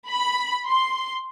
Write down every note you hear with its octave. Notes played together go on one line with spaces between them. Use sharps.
B5
C6